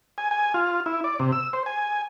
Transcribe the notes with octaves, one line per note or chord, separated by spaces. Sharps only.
G#5
G#5
F4
E4
D5
C3
E6
C5
G#5